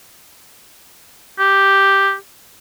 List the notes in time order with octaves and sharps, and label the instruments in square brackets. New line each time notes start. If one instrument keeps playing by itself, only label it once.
[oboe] G4